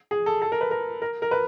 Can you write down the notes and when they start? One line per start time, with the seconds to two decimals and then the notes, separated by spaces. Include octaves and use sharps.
0.11 G#4
0.26 A4
0.42 A4
0.52 A#4
0.61 B4
0.71 A#4
1.02 A#4
1.22 A#4
1.31 B4